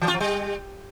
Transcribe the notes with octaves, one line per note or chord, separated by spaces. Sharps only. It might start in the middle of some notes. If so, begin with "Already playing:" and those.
E3
F4
F3
G3